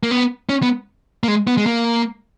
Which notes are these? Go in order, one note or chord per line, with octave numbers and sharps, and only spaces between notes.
A#3
B3
C#4
B3
A#3
G#3
B3
G#3
A#3